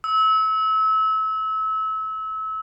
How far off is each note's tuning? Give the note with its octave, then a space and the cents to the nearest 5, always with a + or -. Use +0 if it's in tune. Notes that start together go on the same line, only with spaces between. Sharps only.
E6 -30